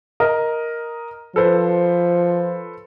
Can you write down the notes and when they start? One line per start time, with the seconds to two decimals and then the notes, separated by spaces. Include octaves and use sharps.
0.20 A#4 D#5
1.36 F3 A4 B4 C5